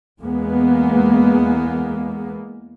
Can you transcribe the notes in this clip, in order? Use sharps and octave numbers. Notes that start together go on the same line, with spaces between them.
E2 G#3 A#3 B3